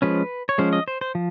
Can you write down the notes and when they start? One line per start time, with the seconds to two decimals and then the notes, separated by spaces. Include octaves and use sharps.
0.02 F3 G#3 C#4 B4
0.49 C#5
0.58 F3 G#3 C#4 C5
0.73 D#5
0.88 C5
1.01 C5
1.15 F3